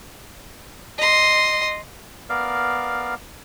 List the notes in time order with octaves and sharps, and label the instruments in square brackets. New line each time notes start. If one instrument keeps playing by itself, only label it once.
[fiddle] D#5 C6
[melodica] B3 A#4 D5 F5